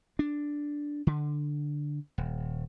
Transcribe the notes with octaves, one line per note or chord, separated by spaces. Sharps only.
D4
D3
D#1